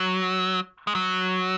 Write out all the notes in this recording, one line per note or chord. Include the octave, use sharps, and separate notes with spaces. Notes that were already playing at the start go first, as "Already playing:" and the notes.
Already playing: F#3
G#3
F#3